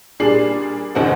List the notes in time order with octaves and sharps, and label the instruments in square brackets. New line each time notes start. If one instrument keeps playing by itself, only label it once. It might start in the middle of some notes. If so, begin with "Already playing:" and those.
[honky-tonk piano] A#2 G3 D4 G#4 C7 F#7
A#1 D#2 C#3 D#4 C5 F#5